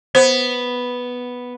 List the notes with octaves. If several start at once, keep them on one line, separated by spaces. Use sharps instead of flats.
B3 C5